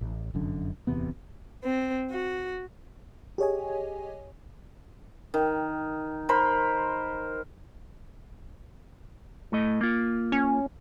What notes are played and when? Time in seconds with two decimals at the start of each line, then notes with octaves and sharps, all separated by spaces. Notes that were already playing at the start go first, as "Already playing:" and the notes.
0.01 A1
0.34 F1 F#2 D3
0.87 D1 E2 C3 B3
1.63 C4
2.10 F#4
3.38 G4 G#4 C#5 D#5 G#5
5.34 D#3
6.29 A#4 C5 B5 C6
9.52 A2 A3 D#5
9.81 A#3 F4
10.32 C#4